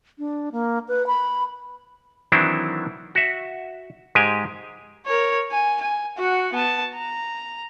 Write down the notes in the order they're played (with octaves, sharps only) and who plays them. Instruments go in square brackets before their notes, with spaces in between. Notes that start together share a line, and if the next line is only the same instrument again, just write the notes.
[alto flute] D4
A#3
B4
B5
[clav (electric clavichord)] D#3 E3 F#3 C4 D4 E4
F#4 E5
G#2 G#3 G4 G#5
[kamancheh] A#4 C#5
G#5
G#5
F#4 F#5
B3 A5
A#5